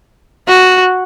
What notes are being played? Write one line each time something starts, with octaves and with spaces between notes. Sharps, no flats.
F#4